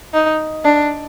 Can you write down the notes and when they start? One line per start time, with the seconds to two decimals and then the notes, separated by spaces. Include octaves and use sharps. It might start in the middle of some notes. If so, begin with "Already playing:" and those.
0.14 D#4
0.65 D4